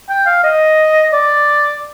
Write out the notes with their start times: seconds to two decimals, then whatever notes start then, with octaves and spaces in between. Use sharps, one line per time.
0.09 G5
0.26 F5
0.44 D#5
1.13 D5